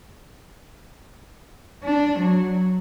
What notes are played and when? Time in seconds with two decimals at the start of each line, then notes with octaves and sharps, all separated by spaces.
1.84 D4
2.20 F#3